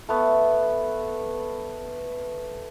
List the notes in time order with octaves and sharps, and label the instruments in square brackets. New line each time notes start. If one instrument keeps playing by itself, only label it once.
[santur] A3 B3